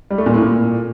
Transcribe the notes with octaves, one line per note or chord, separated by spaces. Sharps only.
G3
A3
A#2
A2
A#2